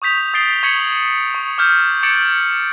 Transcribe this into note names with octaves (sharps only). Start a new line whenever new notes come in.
C#6 D#6 G6 B6 F7
D#6 A6 C7 D7 G7
C#6 G#6 B6 C#7 F#7
C#6 D#6
D6 F6 G6
D6 G#6 A6 C#7 D7 F#7